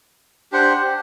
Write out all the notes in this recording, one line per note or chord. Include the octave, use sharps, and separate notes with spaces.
D4 G4 C5 F#5